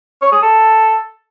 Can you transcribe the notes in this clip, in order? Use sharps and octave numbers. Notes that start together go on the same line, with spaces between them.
C#5
G#4
A4